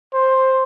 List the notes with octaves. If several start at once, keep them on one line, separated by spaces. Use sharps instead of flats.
C5